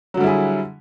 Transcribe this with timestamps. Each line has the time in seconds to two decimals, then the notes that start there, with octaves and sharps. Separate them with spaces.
0.14 F#3
0.17 D3
0.20 G3
0.24 E4
0.27 G#4